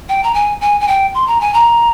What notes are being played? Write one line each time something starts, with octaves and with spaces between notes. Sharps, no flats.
G5
A#5
G#5
G#5
G#5
G5
C6
A#5
G#5
A#5